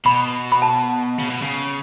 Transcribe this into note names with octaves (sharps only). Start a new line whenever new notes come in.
B2 B5
B5
A5
C#3
B2
C#3